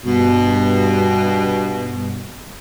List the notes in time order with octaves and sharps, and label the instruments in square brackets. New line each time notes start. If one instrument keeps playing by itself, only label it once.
[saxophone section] G2 B2